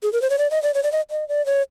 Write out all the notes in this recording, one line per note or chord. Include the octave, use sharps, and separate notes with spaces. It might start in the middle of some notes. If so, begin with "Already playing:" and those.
G#4
A#4
C5
C#5
D5
D#5
D5
C#5
D5
D#5
D#5
D5
C#5